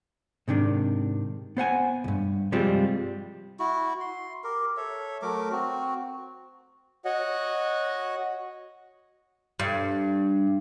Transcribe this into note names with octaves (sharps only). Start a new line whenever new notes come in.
G#2 C3 D#3 D4
B3 C5 F#5 G#5
C2 G2
C3 F3 G3 G#3 C4 F4
E4 F#4
C6
G4 A#4
A4 C#5 E5
F#3 A3 A#4 D6
C4 F#4
F#4 C#5 D#5 F#5
G2